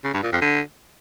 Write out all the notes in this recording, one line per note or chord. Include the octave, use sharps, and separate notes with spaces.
C#3
G2
A#2
F2
D3